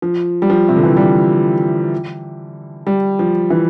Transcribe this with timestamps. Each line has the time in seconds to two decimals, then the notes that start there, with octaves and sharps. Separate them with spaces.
0.02 F3
0.42 G3
0.50 F3
0.69 C3
0.76 D3
0.83 E3
0.90 F3
0.97 G3
2.87 G3
3.19 F3
3.50 E3